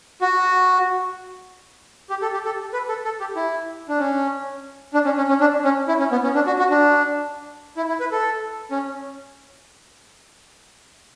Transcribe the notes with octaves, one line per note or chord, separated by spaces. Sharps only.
F#4
G4
A4
G4
A4
B4
A4
A4
G4
E4
D4
C#4
D4
C#4
C#4
C#4
D4
C#4
E4
C#4
B3
C#4
D4
F#4
F#4
D4
E4
E4
B4
A4
C#4